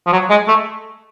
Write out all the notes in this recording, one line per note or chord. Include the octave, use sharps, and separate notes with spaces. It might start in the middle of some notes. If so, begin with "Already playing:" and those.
F3
F#3
G#3
A3